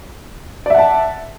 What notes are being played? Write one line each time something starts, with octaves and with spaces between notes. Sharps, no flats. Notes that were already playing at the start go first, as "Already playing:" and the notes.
D5 E5 F#5 A5